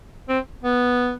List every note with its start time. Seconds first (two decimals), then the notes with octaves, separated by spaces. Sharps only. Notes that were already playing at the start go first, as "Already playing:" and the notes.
0.29 C4
0.63 B3